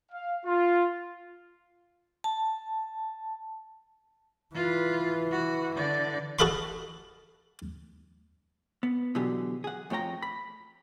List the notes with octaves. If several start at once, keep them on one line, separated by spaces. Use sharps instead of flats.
F5
F4
A5
E3 F4 B4
F#4
D3 D5
F#4 A4 D#5 F5 B5 C6
B3
B2 D3 E3 F#3 G4 G#4
G#4 F#5
F2 A3 C#5 G5 A#5
B5